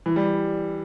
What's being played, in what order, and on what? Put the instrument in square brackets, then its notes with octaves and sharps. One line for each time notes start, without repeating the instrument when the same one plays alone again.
[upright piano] E3
G3